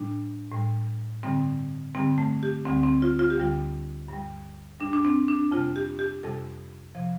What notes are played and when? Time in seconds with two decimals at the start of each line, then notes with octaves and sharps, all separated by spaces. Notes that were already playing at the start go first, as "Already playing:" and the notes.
Already playing: A2 G3 D4
0.51 A2 G3
1.23 G2 D3 G3 C4
1.95 G2 D3 G3 C4
2.18 A3
2.43 G4
2.65 D2 D3 G3 C4
2.83 C4
3.02 F4
3.19 F4
3.30 G4
3.37 D2 D3 G3 F4
4.08 G2 G3
4.80 G3 D4
4.85 G2
4.93 D4
5.05 C4
5.28 D4
5.52 F2 C3 G3 F4
5.76 G4
5.99 G4
6.23 F2 C3 G3 A4
6.95 C3 F3